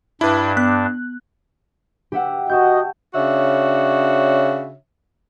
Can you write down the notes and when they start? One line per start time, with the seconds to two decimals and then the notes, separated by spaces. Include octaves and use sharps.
0.21 G2 D4 E4 B4
0.57 B3 F#6
2.12 G4 E5 F#5
2.49 F#4 D#5 A5 C#6 G6
3.14 C#3 D4 F#4 C#5 E5